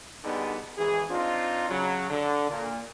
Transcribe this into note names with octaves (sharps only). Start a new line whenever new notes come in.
D3 G3 B3 D#4 G#4
G#1 E3 G#4
C4 D4 D#4 F4
C#3 F#3
D3
A#2